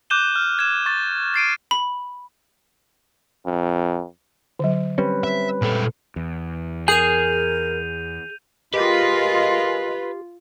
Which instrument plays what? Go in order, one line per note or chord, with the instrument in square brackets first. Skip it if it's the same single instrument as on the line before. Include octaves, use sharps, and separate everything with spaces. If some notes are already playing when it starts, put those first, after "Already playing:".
[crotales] D6 F#6 G6 D#7 E7 G7
F6
G#6 E7
C#6 A6
A6 C7 D7 D#7
[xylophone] B5
[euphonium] F2
[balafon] D3 F#3
[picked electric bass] G3 C4 C#4 [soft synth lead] B4
[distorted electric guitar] E5
A#2 A4
[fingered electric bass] E2
[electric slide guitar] G#4 G#5 [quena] A#4 [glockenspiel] G6 D#7 F7
[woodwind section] G#3 A#4 D#5 [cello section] F4 [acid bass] G4 [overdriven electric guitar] B4